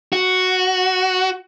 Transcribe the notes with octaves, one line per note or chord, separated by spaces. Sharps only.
F#4